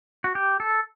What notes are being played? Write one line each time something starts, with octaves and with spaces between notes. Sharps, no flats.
F#4
G4
A4